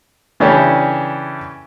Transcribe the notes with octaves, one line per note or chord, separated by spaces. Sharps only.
C#3 E3 C#4 D4 G4 A4